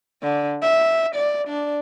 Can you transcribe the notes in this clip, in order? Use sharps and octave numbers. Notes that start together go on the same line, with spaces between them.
D3
E5
D5
D4